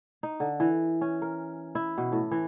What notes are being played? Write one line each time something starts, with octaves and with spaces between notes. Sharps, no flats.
D#4
D3
E3
C#4
A#4
E4
B2
A2
E3